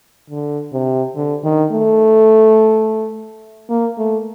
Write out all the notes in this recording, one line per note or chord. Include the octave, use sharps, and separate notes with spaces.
D3
C3
D3
D#3
A3
A#3
A3